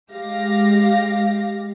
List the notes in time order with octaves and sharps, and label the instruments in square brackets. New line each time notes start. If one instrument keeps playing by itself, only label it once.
[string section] G#3 G4 F5 A#6